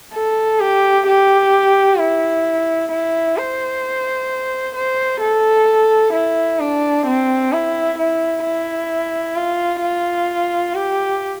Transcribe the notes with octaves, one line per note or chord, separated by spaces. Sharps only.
A4
G4
G4
E4
E4
C5
C5
A4
E4
D4
C4
E4
E4
E4
F4
F4
G4